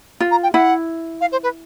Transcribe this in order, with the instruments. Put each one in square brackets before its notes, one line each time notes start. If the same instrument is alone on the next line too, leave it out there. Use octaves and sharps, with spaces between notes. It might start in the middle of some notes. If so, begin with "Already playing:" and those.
[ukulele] F4
[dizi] A#5
G5
[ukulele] E4 [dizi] F#5
[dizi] F5
C5
B4